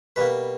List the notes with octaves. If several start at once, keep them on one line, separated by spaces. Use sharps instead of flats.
B2 G3 A#3 B4